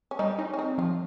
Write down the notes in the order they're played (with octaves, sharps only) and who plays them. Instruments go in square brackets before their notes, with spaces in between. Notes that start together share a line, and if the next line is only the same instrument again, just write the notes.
[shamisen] C#4
[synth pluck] G3 [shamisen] D#4
[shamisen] C#4 [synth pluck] D#4
[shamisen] C#4
[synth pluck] C4 [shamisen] D#4
[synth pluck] F3 [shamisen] F4